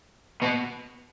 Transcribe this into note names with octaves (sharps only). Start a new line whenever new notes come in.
B2